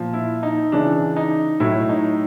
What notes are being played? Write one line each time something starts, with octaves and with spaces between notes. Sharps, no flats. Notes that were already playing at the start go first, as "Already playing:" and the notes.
Already playing: A#2 F3
E4
D#4
C#3 E3 D4
D#4
A2 F#3 E4
D#4